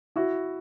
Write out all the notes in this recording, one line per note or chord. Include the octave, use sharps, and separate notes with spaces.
E4 F#4